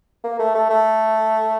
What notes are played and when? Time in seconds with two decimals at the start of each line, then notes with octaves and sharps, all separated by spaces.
0.24 A#3
0.39 A3
0.55 A3
0.70 A3